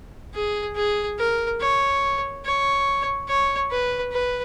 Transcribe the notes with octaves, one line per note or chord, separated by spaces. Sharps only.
G#4
G#4
A#4
C#5
C#5
C#5
B4
B4